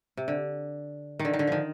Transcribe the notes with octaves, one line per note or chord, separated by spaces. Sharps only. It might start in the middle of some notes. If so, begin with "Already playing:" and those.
C3
D3
D#3
D3
D#3
D3
D#3 F3